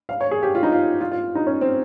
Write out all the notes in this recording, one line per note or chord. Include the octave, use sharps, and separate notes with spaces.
F5
C#5
G#4
G4
F4
D#4
F4
F4
F4
D#4
C#4
C4